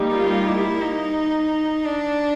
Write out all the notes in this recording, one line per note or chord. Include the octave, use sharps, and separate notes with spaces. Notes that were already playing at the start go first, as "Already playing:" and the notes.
Already playing: G3 A#3 D#4 G4
F4
E4
D#4
D4